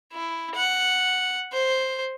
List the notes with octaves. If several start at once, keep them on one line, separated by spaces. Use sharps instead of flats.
E4
F#5
C5